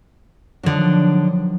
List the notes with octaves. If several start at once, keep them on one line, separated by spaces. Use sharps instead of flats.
D3 D#3 F3 F#3 D4